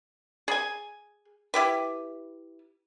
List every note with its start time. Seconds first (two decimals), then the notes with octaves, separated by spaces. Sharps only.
0.48 G#4 G#5
1.54 E4 G4 B4